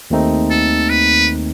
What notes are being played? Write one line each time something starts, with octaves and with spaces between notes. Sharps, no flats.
D#2 D#3 A3 C4 D#4
A4
B4